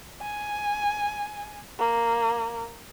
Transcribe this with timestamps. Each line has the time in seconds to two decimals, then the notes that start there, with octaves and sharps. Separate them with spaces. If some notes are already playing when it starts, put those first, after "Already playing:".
0.22 G#5
1.79 A#3